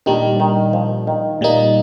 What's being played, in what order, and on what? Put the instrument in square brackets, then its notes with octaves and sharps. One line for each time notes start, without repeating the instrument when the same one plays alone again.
[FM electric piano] A#2 G3 D4 [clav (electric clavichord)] D#3
[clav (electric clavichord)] D#3
F3
D#3
[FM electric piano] A#2 G3 A#3 D#4